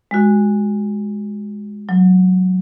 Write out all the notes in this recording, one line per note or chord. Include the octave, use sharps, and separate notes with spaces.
G#3 F#4
F#3